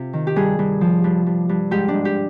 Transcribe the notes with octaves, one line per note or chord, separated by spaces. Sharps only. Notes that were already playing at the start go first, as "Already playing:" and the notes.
Already playing: C3 F4
D#3
G4
G2 G#4
G2
F3
G2
G2
G2
G#2 G4
D4
G#2
G4